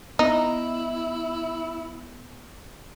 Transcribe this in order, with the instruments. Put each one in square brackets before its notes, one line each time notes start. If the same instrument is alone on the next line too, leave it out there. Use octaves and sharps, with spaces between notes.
[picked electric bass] B3 [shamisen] D#4 [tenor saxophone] E4